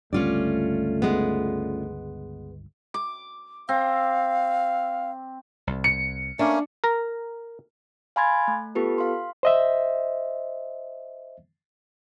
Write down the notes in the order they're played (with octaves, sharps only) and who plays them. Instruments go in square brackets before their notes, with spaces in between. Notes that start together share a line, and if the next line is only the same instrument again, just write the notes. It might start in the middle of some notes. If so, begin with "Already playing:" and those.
[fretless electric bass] G1 C#2 G2 [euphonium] A3 [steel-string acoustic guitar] C#4 F4 D5
[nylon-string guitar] G#3 B3
[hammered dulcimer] D6
[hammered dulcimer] C4 [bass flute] F5
[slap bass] C2
[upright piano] C#7
[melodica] A3 A#3 C#4 [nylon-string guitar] D4
[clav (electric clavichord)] A#4 A#5
[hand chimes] F5 G#5 B5 C6 G#6 A6
A3
B3 F4 G4 A4 B4
F5 C6
[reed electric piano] C5 D#5 E5